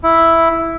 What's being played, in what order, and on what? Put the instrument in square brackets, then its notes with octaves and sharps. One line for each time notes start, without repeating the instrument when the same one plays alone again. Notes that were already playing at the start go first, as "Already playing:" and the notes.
[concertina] E4